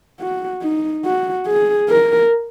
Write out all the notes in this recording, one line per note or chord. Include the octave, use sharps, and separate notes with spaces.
F#4
D#4
F#4
G#4
A#4